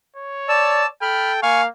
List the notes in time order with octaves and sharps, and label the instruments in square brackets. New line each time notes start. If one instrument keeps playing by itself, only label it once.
[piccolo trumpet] C#5
[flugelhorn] D5 [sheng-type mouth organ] A5 E6
[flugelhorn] A4 [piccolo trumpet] G5 [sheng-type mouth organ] B5 F6
[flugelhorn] A#3 [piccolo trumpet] F5 [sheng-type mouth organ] G#5 C#6